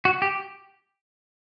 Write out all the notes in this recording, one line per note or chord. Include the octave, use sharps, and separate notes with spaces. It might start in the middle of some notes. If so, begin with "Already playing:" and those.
F#4
G4